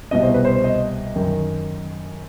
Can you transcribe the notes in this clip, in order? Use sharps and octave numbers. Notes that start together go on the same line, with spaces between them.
C2 B2 D#5
C5
B4
C5
D#5
F#2 D#3